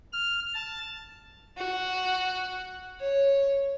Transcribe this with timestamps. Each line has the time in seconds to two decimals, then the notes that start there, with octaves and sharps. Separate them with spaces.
0.13 F6
0.54 A5
1.57 F#4
3.00 C#5